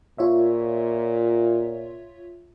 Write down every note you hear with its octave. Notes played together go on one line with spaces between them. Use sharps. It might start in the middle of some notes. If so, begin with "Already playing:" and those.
A#2 F4 C#5 E5